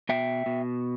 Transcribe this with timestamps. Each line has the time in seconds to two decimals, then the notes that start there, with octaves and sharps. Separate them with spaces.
0.09 B2 E5 G5
0.46 B2